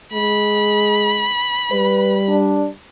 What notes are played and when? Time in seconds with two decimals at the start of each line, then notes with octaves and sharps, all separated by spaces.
0.13 G#3 B5
1.72 G3 B4
2.29 D4